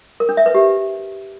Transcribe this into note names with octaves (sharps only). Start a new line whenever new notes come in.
A#4
D4
E5
B4
G4